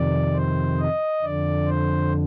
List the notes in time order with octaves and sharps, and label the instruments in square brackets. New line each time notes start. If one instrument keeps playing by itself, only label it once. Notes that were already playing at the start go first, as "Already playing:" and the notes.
Already playing: [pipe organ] F2 C3 D#3 D5
C5
D#5
F2 D3 D5
C5